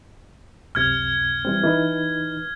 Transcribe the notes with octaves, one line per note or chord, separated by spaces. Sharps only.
C#2 F#2 C3 F6 G#6
E3 G3 C4
E3 D#4 B4